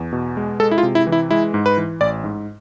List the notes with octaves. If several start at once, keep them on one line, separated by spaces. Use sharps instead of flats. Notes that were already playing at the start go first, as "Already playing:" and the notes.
Already playing: E2
B2
G#3
G#3 A4
E4
F4
C3
E4
E3
E4
G#3 E4
G#2
B4
E3
A1 D5
G#2